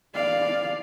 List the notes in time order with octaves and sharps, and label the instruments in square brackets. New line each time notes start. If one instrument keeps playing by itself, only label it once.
[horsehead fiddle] D5 F5